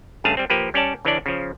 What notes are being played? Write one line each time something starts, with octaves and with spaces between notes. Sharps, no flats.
G2 C#3 A3 G#4 F5 A5
G3 C4
F3 A#3 G4 B4
G3 C#4 C#5 D5 A5
C#3 E3 C#4 D4 D5
C#3 F3